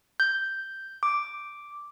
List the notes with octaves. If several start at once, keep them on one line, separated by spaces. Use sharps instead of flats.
G6
D6